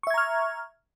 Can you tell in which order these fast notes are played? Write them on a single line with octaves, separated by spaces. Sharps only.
C#6 E5 G#6 A#5 F6